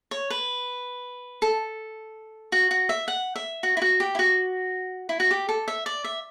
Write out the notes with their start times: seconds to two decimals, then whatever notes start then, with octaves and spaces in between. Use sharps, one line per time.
0.11 C#5
0.30 B4
1.42 A4
2.52 F#4
2.71 F#4
2.89 E5
3.08 F#5
3.36 E5
3.63 F#4
3.77 E4
3.82 F#4
4.00 G4
4.15 E4
4.19 F#4
5.09 E4
5.20 F#4
5.31 G4
5.49 A4
5.68 E5
5.86 D5
6.04 E5